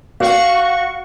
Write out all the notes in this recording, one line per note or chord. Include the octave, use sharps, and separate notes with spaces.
F#4 F5 C#6